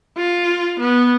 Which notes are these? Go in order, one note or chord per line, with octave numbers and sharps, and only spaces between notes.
F4
B3